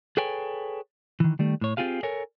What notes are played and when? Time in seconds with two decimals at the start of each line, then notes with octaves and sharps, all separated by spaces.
0.17 G#4 A4 B4 C#5 G5 G#5
1.20 D#3 E3
1.39 D#3 G3 A3
1.61 A2 C#5
1.77 C4 F4 G4 G#4 F5
2.03 A4 A#4 C#5 G#5